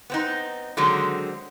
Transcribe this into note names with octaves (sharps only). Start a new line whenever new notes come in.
B3 C4 D#4
D3 D#3 F#3 G#3 C4